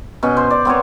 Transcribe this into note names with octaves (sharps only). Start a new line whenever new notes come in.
B2 C#4
C5
D5
B3 C4 A#4 C#5